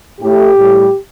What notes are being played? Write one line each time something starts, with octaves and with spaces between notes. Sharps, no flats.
A2 A3 G4
A2 G3